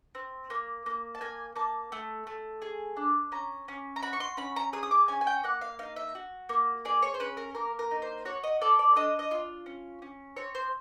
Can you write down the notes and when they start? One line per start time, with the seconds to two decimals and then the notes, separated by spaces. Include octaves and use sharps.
0.15 C4
0.50 A#3
0.86 A#3
1.15 A5
1.21 A#3 G#5
1.56 A#3 A5
1.92 A3
2.27 A3
2.62 G#4
2.97 D4
3.32 C#4 A#5
3.68 C#4
3.96 A#5
4.03 F#4 B5
4.13 C#6
4.20 C6
4.37 C#4 B5
4.56 A#5
4.73 G#4 D#6
4.83 D#6
4.91 D6
5.08 C#4 G#5
5.21 G#5
5.27 G5
5.44 A#3 F#5
5.61 F5
5.79 D#4 F5
5.96 E5
6.15 F#4
6.49 A#3
6.85 G#4 D5
7.02 C#5
7.14 C5
7.20 C#4 B4
7.37 A#4
7.55 A#3 A#4
7.79 A#4
7.91 D#4
8.02 C5
8.25 F#4 C#5
8.44 D#5
8.61 A4 D5
8.79 D5
8.96 D4 D#5
9.19 D#5
9.31 F4
9.66 C#4
10.02 C#4
10.37 C4 C#5
10.55 C5